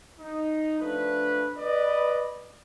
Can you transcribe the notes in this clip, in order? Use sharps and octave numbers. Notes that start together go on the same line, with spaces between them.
D#4
F3 A3 D4 B4
B4 D5 D#5